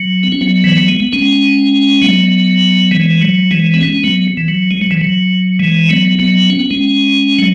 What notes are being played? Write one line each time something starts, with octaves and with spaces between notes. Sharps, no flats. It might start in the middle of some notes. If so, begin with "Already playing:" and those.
Already playing: F#3
B3
C#4
F#3 B3
E3
F#3
G#3
B3
G#3 C#4
F#3 B3
E3 G#3
F#3
E3 G#3
B3
G#3 C#4
C#4
F#3 B3
E3
F#3
G#3
F#3
E3
F#3
E3 G#3
F#3 B3
F#3 B3
C#4
B3
G#3 C#4
F#3